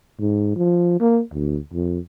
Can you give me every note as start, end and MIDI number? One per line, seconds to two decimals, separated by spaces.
0.19 0.52 44
0.56 0.98 53
1.00 1.21 58
1.33 1.58 38
1.74 1.99 41